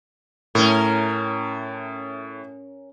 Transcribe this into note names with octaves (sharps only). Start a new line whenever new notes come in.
A2 A3 C#4 A#4